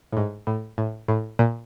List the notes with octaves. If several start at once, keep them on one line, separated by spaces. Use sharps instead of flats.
A2
G#2
A2
A2
A2
A#2